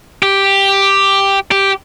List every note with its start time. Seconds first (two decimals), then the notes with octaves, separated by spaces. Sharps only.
0.23 G4
1.51 G4